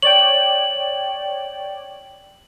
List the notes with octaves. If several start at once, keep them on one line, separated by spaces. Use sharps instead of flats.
C#5 D5 G5 F#7